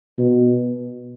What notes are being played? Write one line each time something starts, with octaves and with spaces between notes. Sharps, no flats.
B2